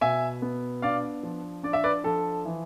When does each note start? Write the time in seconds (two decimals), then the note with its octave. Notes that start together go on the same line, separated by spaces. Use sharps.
0.01 B2 E5 G#5
0.42 B3
0.82 D4 D5 F5
1.23 F3
1.63 D4 D5
1.73 E5
1.84 B4 D5
2.04 F3 A4
2.45 E3